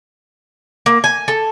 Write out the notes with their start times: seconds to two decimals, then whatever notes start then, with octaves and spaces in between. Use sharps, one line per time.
0.86 A#3
1.04 G#5
1.28 A4